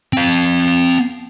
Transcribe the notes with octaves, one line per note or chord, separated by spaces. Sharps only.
C4 F5